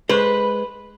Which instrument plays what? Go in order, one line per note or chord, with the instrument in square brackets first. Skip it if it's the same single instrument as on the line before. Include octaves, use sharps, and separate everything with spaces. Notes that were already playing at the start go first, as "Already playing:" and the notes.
[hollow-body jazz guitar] G#3 C5 [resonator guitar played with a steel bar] B4